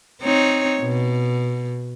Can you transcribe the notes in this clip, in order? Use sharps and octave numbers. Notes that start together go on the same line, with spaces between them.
C4 D#4 C#5
B2